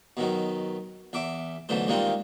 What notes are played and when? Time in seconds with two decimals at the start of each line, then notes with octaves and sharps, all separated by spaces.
0.17 B2 D#3 F#3
1.13 E2 E5 D6
1.69 B1 D3 E3 A3 C5
1.88 D#3 G3 G#3 A#3 C4 F4